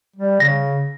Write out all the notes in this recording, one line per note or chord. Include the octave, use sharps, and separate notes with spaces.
G3
C#3 A#6